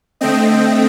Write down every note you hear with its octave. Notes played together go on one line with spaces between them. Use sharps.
D3 A3 C4 D#5 G5